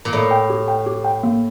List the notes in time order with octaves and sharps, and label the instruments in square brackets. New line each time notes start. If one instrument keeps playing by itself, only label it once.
[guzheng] A#2
[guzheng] A2 [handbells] D5
[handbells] G5
G4
G5
G4
G5
A#3